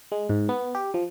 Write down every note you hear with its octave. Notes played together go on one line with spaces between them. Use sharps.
G#3
G#2
B3
G4
F3